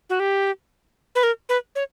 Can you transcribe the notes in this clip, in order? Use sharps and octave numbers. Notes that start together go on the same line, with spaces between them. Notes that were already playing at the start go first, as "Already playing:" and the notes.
F#4
G4
B4
A#4
B4
C#5